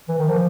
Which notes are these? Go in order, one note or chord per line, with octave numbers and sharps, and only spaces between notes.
E3
D#3
F3